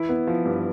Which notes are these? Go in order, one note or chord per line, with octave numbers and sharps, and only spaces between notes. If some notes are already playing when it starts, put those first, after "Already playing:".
Already playing: E3 E4
B3
F3
G2